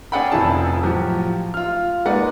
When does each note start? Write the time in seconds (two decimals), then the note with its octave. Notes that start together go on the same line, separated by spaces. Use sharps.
0.12 C#4 G#4 D5 F#5 G5 B5
0.32 F1 F2 F3 E4 G#4 A5
0.83 A2 F3 F#3 F#4 G4
1.54 F4 F6
2.06 G#3 A#3 D#4 B4 D5 F#5